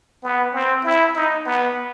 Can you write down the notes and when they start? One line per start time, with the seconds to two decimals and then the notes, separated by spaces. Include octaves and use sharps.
0.23 B3
0.54 C4
0.85 E4
1.15 D#4
1.46 B3